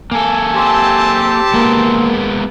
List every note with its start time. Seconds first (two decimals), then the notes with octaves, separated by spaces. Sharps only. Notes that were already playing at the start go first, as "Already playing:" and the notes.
0.11 A#3 A4 G#5
0.56 C4 G4 A5
1.54 G#3 A#3 B3 A#4